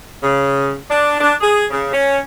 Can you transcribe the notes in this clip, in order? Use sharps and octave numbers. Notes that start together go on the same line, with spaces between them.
C#3
D4
D4
G#4
C#3
C#4